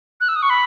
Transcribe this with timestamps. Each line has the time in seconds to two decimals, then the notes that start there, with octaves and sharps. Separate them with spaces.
0.20 F#6
0.28 E6
0.36 D#6
0.42 C#6
0.50 B5